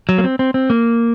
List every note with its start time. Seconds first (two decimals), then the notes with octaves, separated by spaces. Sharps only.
0.09 F#3
0.18 A#3
0.24 C4
0.39 C4
0.54 C4
0.70 A#3